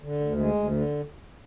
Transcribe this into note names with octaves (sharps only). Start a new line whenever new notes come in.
D3
D2
G#3
D2
D3